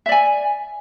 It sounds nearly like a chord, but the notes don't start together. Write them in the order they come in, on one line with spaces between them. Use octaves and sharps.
E5 D5 G#5